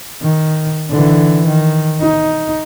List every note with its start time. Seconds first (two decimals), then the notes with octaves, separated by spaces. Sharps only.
0.22 D#3
0.90 D3 E3
1.46 D#3
2.00 D#4